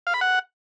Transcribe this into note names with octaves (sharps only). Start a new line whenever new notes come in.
F5
B5
F#5